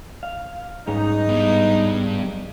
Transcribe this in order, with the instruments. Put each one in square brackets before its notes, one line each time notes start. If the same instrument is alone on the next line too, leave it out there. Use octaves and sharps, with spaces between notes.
[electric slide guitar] F5
[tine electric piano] G#2 G#4 [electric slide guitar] G3 C#4 B4 [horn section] D#4
[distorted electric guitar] G2 [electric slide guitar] B3